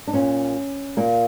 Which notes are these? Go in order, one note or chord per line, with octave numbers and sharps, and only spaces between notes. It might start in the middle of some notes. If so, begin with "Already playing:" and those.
D4
A#2 C#4
A#2 A#3